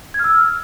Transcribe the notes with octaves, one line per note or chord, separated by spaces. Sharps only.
G#6
F6
E6